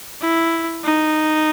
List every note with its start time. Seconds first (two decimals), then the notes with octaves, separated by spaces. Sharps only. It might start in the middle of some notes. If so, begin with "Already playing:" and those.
0.21 E4
0.84 D#4